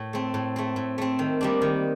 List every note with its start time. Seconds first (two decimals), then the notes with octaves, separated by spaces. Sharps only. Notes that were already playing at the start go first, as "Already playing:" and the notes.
Already playing: A2
0.13 A3 C4
0.34 A2
0.56 A3 C4
0.76 A2
0.98 A3 C4
1.19 D#3
1.41 G3 A#3 D4
1.62 D#3